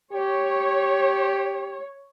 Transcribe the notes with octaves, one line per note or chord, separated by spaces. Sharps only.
G4 C#5